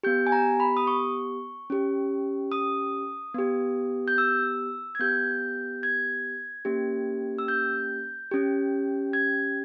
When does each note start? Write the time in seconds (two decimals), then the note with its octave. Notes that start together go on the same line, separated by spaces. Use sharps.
0.03 B3 G4 G6
0.27 G#5
0.32 A#5
0.60 B5
0.77 D#6
0.87 C#6
1.70 C#4 G4
2.52 D#6
3.34 B3 G4
4.08 G6
4.18 E6
4.95 G#6
4.99 B3 G4 G6
5.83 G#6
6.65 A#3 C#4 G4
7.39 E6
7.48 G6
8.31 C#4 G4
9.13 G#6